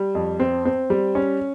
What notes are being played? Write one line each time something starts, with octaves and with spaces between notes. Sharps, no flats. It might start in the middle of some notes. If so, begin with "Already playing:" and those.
Already playing: G3
F2
C4
C4
G3
C#4